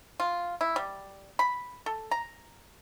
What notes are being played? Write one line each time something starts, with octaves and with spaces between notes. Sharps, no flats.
F4
E4
G3
B5
A4
A#5